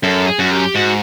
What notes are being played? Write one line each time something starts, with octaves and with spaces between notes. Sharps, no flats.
F#2 A4
G#4
F#2 F#4
G4
G#2 F#4